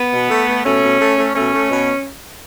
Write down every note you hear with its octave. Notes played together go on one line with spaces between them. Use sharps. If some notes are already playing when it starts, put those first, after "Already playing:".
Already playing: B3
B2
A3
A3
B2 A3 C#4
B2
A3
A3
B2 A3 C#4
A3
B2